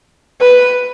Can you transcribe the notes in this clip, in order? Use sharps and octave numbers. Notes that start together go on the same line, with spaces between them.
B4